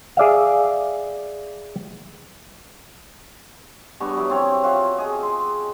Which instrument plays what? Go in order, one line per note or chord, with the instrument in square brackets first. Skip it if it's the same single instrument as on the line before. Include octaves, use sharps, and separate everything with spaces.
[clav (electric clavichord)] G#4 D5 E5 F5
[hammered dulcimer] G2 B3 C#6
F#3 E4
C4 A4 C#5
F4 F#4 E5
G#4 D#5
C6